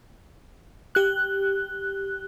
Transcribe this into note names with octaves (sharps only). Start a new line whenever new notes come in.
G4 F#6